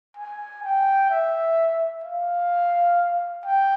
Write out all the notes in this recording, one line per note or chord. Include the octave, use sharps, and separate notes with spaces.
G#5
G5
E5
F5
G5